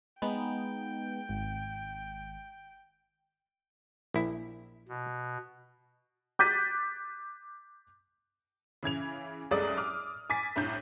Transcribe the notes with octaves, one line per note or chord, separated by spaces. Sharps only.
G#3 B3 D#4 G5
G#1
A#1 E4
B2
D6 F#6 G6 A6 B6 D#7
C#3 E3 G#6 F7
C2 F#2 G#3 A4 D5 D#6
D6 D#6 F6
G#5 D6 A6 B6
C2 A2 D4 G6